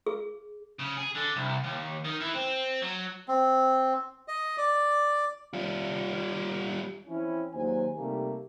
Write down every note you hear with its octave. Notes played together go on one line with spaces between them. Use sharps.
G#4
C#3
G#4
D3
C2
D#2
D#3
E3
C4
F#3
C4
D#5
D5
G3 F4
E3 C4 C#4 E4
D#2 A#2 F#3 G#3 C5 G#5
C3 G3 A3 A#3 D#4 G4